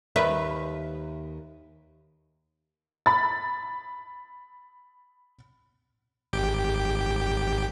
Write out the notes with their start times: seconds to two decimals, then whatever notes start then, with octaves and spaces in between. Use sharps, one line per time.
0.16 D#2 B4 E5
3.06 B5 A6
6.33 G#1 G4 G5